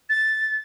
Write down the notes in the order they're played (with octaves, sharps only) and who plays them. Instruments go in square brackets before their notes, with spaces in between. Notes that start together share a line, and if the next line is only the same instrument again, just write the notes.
[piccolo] A6